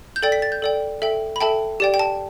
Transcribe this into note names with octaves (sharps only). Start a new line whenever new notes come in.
G6
A4 D5 G5 A6
B6
A6
G6
A4 D5 G5
A4 E5 G5
B5
A4 E5 G5 A5
G4 D5 G5
G5
A5